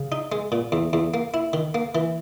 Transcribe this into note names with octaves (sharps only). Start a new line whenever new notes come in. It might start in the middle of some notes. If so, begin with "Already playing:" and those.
Already playing: C#3
D#4
G#3
A#2
E2
E2
A#3
E4
D#3
A#3
E3